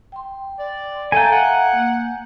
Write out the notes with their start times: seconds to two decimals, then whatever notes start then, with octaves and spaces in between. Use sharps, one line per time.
0.12 G5 C6
0.59 D5
1.12 A4 E5 F5 G5 G#5 A#5
1.32 F#5
1.73 A#3